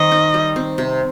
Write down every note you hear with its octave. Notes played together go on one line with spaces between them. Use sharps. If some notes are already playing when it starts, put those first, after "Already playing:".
Already playing: D#3 G3 C4 D#5
D#4
G3
C4
C3